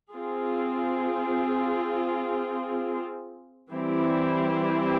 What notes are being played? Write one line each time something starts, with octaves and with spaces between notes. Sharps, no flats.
C4 F4 G#4
E3 G3 C4 E4 G4